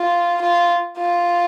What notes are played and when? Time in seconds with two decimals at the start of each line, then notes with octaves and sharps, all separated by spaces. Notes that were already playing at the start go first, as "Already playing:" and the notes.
Already playing: F4
0.41 F4
0.98 F4